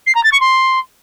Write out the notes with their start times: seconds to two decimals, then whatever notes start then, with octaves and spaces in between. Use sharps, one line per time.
0.06 C7
0.15 A#5
0.23 A6
0.32 C#6
0.40 C6